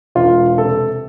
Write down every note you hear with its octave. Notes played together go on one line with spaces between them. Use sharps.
E1 F4
C3 A4